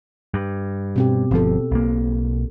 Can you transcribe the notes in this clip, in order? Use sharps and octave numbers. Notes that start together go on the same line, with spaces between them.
G2
B2 C4 G4
G1 F3 C4 A4
B1 A#3